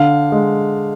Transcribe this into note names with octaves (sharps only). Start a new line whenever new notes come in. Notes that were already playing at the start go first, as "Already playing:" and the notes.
Already playing: D3 F5
G#3